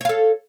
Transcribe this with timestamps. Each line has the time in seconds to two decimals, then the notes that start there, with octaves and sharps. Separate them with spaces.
0.01 C#5
0.05 F5
0.09 A4